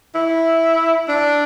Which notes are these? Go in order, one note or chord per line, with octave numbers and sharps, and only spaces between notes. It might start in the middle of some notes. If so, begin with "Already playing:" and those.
E4
D4